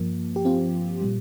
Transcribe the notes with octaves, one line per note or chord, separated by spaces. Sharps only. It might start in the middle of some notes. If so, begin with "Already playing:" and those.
Already playing: G2 F3 A#3
G4
C4 F4
A#2 G3